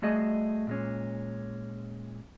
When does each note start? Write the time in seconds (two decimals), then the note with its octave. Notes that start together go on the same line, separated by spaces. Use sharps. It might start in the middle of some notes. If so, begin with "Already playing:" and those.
0.02 G3 A3 F#4 G#4 D#5
0.67 A#2 G#3 C#4